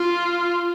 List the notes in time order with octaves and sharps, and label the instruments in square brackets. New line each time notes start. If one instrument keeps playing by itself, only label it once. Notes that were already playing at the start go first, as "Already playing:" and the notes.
Already playing: [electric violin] F4